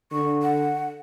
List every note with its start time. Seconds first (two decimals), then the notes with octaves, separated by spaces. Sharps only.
0.12 D3 C#6
0.42 F#5